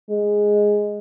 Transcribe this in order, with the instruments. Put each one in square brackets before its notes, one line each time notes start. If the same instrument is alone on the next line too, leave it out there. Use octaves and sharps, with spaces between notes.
[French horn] G#3